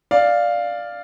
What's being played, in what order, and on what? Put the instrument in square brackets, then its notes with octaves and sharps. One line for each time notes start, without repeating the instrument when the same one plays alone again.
[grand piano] D5 F5